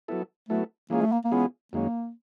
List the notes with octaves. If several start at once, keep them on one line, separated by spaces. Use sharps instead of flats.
F#3 B3 E4 A4
F#3 A3 B3 E4 A4
E3 G#3 A#3 C#4 F4 G#4
A3
A#3
A#3
E3 G#3 B3 C#4 F4 G#4
F#2 D#3 G#3 A#3 C#4